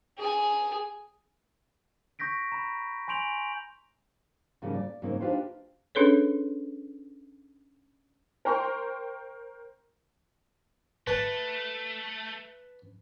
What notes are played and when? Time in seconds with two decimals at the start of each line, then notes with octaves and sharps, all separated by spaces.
0.18 G#4 G#5
2.19 C#6 G6 A#6 B6 D7
2.52 A#5 B5
3.08 G#5 C6 G6 D7 F7 F#7
4.62 G#2 C#3 F3 G3 A#3
4.74 D5
5.02 G#2 C#3 A#3 C4 D#4
5.21 D4 D#4 F4 G4 B4 C5
5.95 C#4 D4 G#4 A4 B4 C#5
8.45 A#4 C5 G5 A#5 C6 C#6
11.07 A3 B4 A5